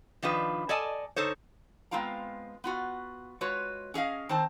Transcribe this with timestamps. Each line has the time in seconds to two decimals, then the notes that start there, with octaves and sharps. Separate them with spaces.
0.22 D#3 F3 D4 F4 B4
0.69 A4 D5 D#5 G#5 A5
1.16 D3 D#4 A4 C5 C#5
1.91 G#3 B3 C4 F4 F5 A#5
2.64 B3 F4 F#4
3.41 G#3 F4 F#4 B4 C#5
3.94 C#4 G#4 D#5 F5
4.29 D#3 C4 C5 A5